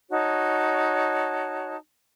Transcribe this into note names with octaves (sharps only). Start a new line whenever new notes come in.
D#4 F#4 C#5 A5